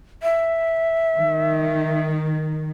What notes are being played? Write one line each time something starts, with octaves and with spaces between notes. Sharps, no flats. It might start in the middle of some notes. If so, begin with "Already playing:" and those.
E5
D#3